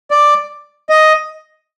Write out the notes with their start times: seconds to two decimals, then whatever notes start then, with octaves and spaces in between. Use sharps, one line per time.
0.11 D5
0.89 D#5